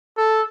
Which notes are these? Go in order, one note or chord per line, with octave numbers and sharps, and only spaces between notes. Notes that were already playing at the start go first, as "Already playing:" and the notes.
A4